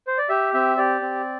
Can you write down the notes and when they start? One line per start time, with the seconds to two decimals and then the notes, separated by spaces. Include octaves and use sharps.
0.07 C5
0.18 D5
0.29 G4 E5
0.54 C4 E5
0.77 G4 D5
1.01 C4